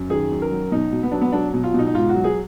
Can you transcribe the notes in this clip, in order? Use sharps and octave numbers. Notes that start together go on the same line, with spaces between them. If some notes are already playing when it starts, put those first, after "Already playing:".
Already playing: F#2
D#3 G#4
F#2
A#4
F#3
B2 D#4
B2
B3
F#3 D4
B3
F#3 D4
B2
F4
B2 D#4
D#4
G#2 F4
F#4
F#3
G#4